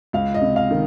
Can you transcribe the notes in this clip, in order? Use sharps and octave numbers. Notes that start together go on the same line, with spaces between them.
C#2 F5
D#5
C3
F5
D#3